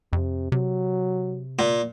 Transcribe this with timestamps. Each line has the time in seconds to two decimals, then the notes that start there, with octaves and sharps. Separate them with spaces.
0.13 F2 C3
0.52 C3 F#3
1.59 A#2